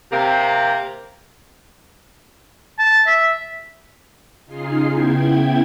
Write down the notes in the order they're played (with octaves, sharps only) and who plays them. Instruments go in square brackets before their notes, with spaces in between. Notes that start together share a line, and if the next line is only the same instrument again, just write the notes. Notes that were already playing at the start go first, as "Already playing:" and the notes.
[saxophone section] C3 A#3
[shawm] A5
E5
[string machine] C#3 D#4 F4 G#4 C7
C#3 B3 E4 G5 G#6